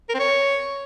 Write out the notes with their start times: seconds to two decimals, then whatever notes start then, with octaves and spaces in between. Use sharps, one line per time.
0.09 A#4
0.14 C4
0.19 C#5